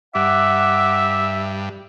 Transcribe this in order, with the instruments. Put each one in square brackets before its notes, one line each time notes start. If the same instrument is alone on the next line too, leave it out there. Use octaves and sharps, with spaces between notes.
[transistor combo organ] G2 [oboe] E5 [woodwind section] F#5 D6